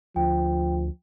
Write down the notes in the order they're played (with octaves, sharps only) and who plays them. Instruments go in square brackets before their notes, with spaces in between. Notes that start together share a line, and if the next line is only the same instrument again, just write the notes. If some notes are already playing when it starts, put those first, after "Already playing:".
[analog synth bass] D2 [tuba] F3 [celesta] G5